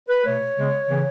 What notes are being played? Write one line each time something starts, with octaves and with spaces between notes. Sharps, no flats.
B4
B2 A3 C#5
C#3 G#3 B3
C#3 E3 B3